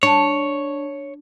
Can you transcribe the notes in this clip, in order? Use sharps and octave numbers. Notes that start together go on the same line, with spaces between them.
D4 C#5